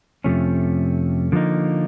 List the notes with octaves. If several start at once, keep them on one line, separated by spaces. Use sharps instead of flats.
F2 C3 F3 A3 C#4
D3 F3 A#3 D#4